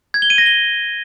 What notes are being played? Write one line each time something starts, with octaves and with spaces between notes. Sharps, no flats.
G#6
G7
D#7
A#6
G7